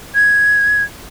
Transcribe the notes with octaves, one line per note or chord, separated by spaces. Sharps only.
G#6